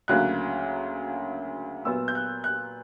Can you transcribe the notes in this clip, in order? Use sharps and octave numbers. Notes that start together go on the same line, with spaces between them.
D2 C#3 F#3 A#3 F#6
A#2 F#3 B3 E6
G6
F#6
F#6